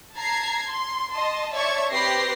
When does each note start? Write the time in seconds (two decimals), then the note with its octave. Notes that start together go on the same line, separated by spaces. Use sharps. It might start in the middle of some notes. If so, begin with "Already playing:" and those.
0.15 A5 A#5 G#6 C7
0.69 C6
1.12 D#5 A5 C6
1.54 C#5 D5 E5 A5 C#6 G#6
1.92 C4 G4 B4 A#6 C7